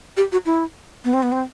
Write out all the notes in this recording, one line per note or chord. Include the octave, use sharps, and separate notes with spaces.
G4
F#4
E4
B3
C4
B3
C4